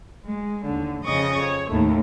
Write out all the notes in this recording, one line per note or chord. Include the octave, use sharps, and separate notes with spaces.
G#3
D#2 D3
F2 C#3 D#5 C#6 D#6
C#5
D#2 A2 A3